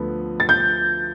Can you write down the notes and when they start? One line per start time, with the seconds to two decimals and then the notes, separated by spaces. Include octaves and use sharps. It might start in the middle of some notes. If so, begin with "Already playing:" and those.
Already playing: D2 D3 F3 B3
0.40 A6
0.49 G6